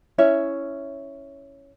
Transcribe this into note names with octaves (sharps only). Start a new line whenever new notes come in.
C#4 E4 C#5 E5